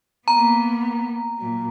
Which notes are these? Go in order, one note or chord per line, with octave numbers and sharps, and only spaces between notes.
A#3 B3 A#5
A#2 F#3